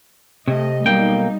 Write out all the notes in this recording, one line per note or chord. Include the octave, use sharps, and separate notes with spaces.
C3 A3 D#5
B1 G3 A#3 D#4 G5